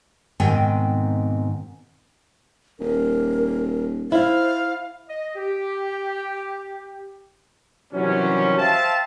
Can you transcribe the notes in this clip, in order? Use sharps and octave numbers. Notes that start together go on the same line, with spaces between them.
G#2 B2 D#3 C4 G5 G#5
D#1 A#4
E4 C5 F5
D#5
G4
C3 D#3 E3 F#3 G3 C#4
C5 E5 F5 G5 A5